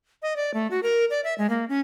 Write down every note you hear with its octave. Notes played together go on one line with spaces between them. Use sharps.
D#5
D5
A3
F#4
A#4
D5
E5
G#3
A#3
C#4